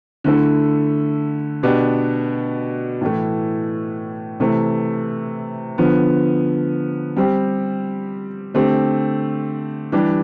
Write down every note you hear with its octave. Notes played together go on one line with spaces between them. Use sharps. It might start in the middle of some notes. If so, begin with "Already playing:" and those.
D3 A3 E4 A4
B2 B3 D4 G4
A2 E3 A3
C3 E3 A3
D3 F3 B3
G3 C4 G4
D3 A3 C4 G4
E3 G3 D4 G4